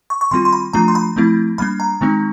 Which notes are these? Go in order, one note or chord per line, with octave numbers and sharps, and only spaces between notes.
C#6
C#6
D#3 G3 C4 F4 C6
C6
B5
F3 A3 D4 F4 A#5
C6
B5
F3 A3 C4 E4
G3 A#3 D4 B5
A#5
D#3 G#3 C4 D#4